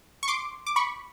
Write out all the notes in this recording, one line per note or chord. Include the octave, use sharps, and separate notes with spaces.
C#6
C6 D6
D6
B5 C#6